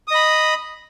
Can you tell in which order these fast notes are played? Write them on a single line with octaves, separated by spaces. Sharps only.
D#6 D#5 B5